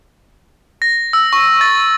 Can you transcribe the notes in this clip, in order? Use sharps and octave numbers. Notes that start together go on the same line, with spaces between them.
A#6
E6
C#6
A6